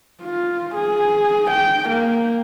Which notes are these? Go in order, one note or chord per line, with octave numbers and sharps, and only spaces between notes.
F4
G#4
G5
A#3